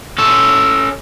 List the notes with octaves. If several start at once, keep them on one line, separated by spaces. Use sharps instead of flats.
C#4 A4